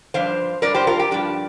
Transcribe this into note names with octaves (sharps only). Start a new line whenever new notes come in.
G2 F3 D4 C5 F5
G2 F3 D4 A#4 D5
G4 C5
F4 A#4
G4
G2 F3 D4 G4